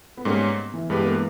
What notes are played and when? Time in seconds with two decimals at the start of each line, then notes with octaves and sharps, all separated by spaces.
0.17 B3
0.25 G#2 G3 A#3 C#4
0.74 E3
0.90 G2 G3 G#3 B3 G4 B4
1.06 A#3